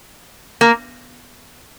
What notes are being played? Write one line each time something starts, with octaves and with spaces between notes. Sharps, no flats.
A#3